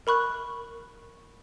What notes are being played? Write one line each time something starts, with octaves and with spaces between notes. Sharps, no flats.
A#4 B5 C#6 F#6